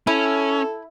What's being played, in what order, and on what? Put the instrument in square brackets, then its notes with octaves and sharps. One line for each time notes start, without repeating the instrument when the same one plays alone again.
[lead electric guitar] C#4 [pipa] E4 [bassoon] A4